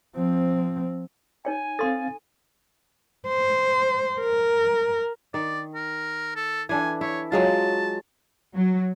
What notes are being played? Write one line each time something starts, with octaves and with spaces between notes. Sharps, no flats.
F3 C4
D#4 C#5 G5 G#5
C4 A4 F5 C6 A6
C5
A#4
D#3 D5
A#4
A4
E3 D4 A4 G#5
E4 C#5
F#3 G#3 F4 A5
F#3